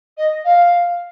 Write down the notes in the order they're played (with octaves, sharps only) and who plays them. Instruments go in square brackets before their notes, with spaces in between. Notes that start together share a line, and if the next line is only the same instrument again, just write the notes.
[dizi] D#5
F5